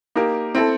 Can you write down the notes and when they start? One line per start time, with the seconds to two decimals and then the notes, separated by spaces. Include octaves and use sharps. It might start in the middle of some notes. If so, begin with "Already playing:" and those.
0.15 A#3 D#4 G4 A#4
0.55 C4 E4 A4